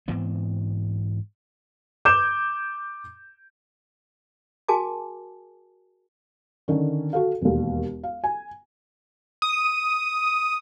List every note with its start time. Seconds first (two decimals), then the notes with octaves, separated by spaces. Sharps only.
0.08 G#2 E3 B3 C4
2.05 D6 G6 E7
4.69 F#4 G#4 A#4 G#5 A5 D6
6.68 D3 D#3 C#4
7.13 F#4 A4 F5
7.41 E1 D#2
8.04 F5
8.24 G#5
9.42 D#6